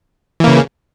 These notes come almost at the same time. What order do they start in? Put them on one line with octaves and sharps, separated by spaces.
E3 A#3 C#3